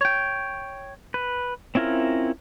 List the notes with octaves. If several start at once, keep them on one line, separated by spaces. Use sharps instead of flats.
C#5 G5
B4
C4 C#4 E4 F4 A#4